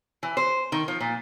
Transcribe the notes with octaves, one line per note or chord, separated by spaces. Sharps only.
E3
C5
D#3
F3
A#2